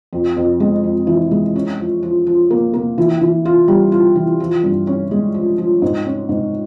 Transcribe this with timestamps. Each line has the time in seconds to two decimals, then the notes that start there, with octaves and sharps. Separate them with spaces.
0.13 F2
0.37 F2
0.60 G#3
0.84 F2
1.07 E3
1.31 G#3
1.56 C#4
1.78 F3
2.03 F3
2.27 F3
2.50 A#3
2.74 A#3
2.98 E3
3.21 E3
3.45 F4
3.68 G3
3.92 F4
4.15 E3
4.40 F3
4.63 G2
4.87 C#4
5.11 G#3
5.34 F3
5.58 F3
5.82 G#2
6.06 C#4
6.29 G#2